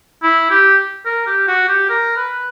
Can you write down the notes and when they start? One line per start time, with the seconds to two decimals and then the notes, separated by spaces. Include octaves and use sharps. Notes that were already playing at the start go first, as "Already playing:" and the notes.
0.23 E4
0.51 G4
1.05 A#4
1.27 G4
1.48 F#4
1.68 G4
1.89 A#4
2.16 B4